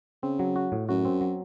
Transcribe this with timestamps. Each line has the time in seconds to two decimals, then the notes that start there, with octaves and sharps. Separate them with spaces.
0.23 C#3 C4
0.39 F#3
0.56 F#4
0.72 A2
0.89 F#2 F#4
1.05 C4
1.21 F#3